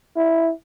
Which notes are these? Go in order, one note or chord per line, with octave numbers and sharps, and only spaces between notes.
E4